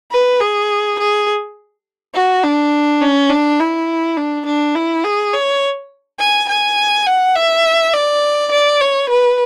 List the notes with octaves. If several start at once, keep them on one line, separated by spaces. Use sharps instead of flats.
B4
G#4
G#4
F#4
D4
C#4
D4
E4
D4
D4
E4
G#4
C#5
G#5
G#5
F#5
E5
D5
D5
C#5
B4